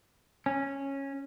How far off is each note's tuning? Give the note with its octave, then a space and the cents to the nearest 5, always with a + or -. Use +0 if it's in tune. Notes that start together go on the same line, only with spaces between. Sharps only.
C#4 -10